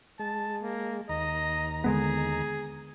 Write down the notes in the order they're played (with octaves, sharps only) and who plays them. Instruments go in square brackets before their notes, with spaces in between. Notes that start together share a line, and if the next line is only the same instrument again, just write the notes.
[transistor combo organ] G#3 [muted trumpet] A5
[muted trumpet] A#3
[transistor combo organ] D#2 A#5 [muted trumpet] D#5
[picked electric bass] D3 G#3 B3 [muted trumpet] G#4